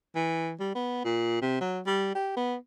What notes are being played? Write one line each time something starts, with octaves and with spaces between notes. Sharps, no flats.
E3
G3
B3
A#2
C3
F#3
G3
G4
B3